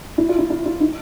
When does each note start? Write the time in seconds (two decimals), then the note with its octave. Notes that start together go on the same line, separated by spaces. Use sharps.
0.18 E4
0.29 F4
0.39 E4
0.50 E4
0.66 E4
0.80 D#4